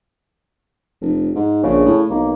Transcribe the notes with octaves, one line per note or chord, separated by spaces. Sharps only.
F1
G#2
A#1 C#3
A2
B1 A#3